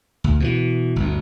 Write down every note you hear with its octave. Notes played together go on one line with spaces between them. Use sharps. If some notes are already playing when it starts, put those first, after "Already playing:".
D2
B2 D3 E3
G1 D2